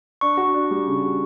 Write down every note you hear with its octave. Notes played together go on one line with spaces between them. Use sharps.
D4 C#6
F#4
D4
G3
C#3
F#4